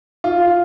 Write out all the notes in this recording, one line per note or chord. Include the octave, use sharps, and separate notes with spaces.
F4